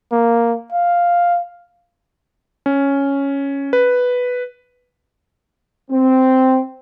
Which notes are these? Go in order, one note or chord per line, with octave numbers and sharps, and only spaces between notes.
A#3
F5
C#4
B4
C4